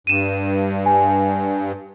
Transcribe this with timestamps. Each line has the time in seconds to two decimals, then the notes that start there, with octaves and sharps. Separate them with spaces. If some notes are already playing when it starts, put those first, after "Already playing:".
0.07 G2 D#7 E7
0.86 G#5